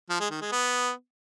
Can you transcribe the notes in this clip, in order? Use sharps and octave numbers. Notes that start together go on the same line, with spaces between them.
F3
G#3
D#3
G#3
B3